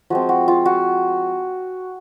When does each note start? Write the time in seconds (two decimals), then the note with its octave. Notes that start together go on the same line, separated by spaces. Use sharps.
0.10 F3 G#3 C4 F#4
0.29 F#4
0.48 F4
0.66 F#4